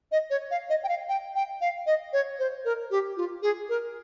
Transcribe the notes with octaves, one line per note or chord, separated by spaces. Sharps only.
D#5
C#5
F5
D#5
G5
F5
G5
G5
F5
D#5
C#5
C5
A#4
G4
F4
G#4
A#4